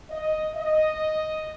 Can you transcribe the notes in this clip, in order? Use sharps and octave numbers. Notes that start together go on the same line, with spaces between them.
D#5
D#5